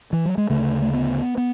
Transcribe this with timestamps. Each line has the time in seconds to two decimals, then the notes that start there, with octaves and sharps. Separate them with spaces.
0.13 E3
0.26 F#3
0.38 G#3
0.50 D2 C#3 A3
0.82 A3
0.93 B3
1.38 B3